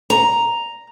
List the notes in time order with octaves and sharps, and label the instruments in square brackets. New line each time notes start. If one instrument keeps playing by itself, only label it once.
[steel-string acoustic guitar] A#5